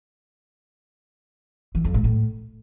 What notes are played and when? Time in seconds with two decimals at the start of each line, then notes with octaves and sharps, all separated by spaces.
1.75 E3
1.84 F2
1.94 G#2
2.04 A2